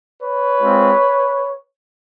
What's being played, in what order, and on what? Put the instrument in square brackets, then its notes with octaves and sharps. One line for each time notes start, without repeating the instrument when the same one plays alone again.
[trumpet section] B4 C#5
G#3 C4 F4